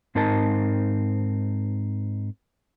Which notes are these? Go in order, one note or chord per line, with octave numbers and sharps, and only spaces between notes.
G#2 C4 D#4 A#4 D#5 A5